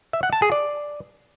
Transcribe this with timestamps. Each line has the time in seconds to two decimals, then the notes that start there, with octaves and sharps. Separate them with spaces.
0.13 E5
0.23 F#5
0.33 A5
0.42 G#4
0.52 D5